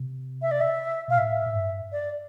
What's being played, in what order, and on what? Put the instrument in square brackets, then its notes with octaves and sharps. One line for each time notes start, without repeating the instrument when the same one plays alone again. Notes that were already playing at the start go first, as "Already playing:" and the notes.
Already playing: [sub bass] C3
[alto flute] E5
D5
E5
[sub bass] B2 [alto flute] F5
[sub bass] A2 [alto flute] E5
[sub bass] A2
G2
[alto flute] D5